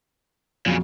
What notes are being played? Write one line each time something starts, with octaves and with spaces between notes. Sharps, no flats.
F2 A#2 C#3 F#3